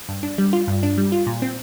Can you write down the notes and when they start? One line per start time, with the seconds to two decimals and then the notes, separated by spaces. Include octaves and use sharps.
0.09 G2
0.23 D4
0.38 G3
0.53 F4
0.68 G2
0.83 D4
0.98 G3
1.12 F4
1.27 A#2
1.42 C4